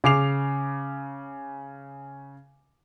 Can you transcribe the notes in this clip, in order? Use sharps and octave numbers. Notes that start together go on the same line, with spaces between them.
C#3 D6 C7 F7